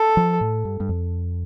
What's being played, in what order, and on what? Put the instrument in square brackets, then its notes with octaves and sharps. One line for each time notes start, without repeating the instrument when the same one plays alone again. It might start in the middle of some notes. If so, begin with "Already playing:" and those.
Already playing: [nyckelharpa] A4
[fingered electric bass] F3
A2
G2
G2
F2